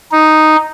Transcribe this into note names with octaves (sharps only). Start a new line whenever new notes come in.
D#4